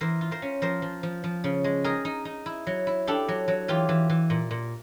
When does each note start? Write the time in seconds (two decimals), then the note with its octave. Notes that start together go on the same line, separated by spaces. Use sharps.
0.01 E3 A#4 C5
0.21 F4
0.31 A#4 C5
0.42 C#4
0.62 F3 A#4 C5
0.82 F3
1.03 F3
1.24 F3
1.44 C#3
1.64 G#3
1.84 D#4 G#4 A#4
2.05 D#4
2.25 D#4
2.46 E4
2.67 F#3
2.87 E4
3.07 D4 G4 A4
3.28 F#3
3.48 F#3
3.68 E3 F4 G4
3.89 E3
4.10 E3
4.30 A#2
4.51 A#2